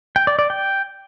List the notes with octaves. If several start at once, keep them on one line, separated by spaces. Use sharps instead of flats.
G5
D5
D5
G5